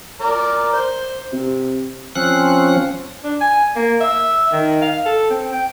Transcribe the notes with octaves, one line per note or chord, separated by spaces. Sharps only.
A#4 D5 A#5
C5
C3
F3 C4 C#4 F#6
D4
G#5
A#3
E5
D#3
F5
A4
C4
G5